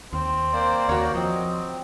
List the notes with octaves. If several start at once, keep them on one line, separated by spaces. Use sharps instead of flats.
D#2 C4
A#3 C5 D5
D#2 F#4 A#4 C#5
F3 C4 D#5